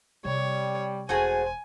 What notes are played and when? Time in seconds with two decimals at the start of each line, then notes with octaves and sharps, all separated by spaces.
0.25 C3 G3 C4 C#5
1.09 E1 A3 F#4 G#4 C5 G#5